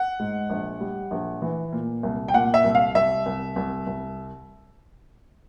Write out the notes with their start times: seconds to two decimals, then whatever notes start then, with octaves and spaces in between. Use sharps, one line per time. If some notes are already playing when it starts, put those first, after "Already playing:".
Already playing: F#5
0.19 G#2
0.50 A#1
0.80 G3
1.11 A#1
1.42 E3
1.72 A#2
2.03 C2
2.28 G5
2.34 A#2 F#5
2.54 E5
2.64 C2
2.75 F5
2.95 C2 E5
3.26 C2
3.56 C2
3.87 C2